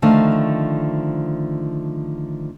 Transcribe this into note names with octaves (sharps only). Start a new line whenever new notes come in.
D3 D#3 F3 A3 F5